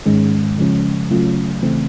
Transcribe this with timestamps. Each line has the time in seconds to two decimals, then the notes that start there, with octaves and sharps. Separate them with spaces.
0.06 G#2 D#3 G#3 C#4
0.58 C#3 F3 G#3 C#4
1.11 C#3 F#3 A3 C#4 F4
1.63 C#3 E3 A3 C4